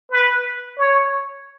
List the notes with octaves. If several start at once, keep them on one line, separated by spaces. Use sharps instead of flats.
B4
C#5